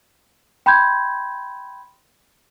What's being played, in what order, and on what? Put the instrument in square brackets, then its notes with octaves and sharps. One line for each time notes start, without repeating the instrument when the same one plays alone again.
[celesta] G5 B5 C6 G6 G#6